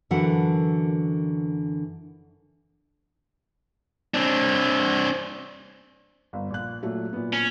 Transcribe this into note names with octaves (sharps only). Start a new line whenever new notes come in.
F#2 D3 E3 F#4 A#4 F#5
C4 D4
G1
A#1 F#6
A#2 F#3 A3
A#2 B3
C#4